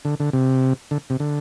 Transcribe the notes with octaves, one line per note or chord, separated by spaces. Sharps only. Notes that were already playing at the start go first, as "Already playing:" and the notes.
D3
D3
C3
D3
C3
D3